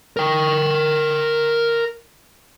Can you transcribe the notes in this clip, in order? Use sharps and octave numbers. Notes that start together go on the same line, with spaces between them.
A#4 G5